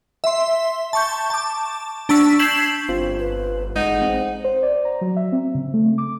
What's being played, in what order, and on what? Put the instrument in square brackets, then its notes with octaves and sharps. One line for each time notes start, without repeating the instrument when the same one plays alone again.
[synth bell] E5 C6
A5 C#6 G6
A5 D6
D4 A5 C#6 E6 B6
G6 G#6 B6 C7 E7 F#7
[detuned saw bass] G1 [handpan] C4 F4 C5
[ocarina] B4
[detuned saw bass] A1 [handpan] G#3 [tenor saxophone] D#4 [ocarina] F#5
[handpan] C4
[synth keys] C5
D5
A#5
F#3
E5
C4
C#3
A3
D6